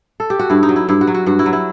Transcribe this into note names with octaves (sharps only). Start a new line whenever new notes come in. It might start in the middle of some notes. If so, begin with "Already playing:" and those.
A4
G4
F#4
G2 E4
D#4
F#3
E4
G2 E4
F#4
F#3
F#4
G2 F#4
E4
F#3
E4